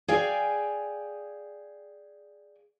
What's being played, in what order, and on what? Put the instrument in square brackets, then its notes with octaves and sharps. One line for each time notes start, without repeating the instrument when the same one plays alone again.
[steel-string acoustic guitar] G#4 D5 F5 G5 G#5